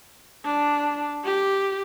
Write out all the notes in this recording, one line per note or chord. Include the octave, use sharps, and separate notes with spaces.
D4
G4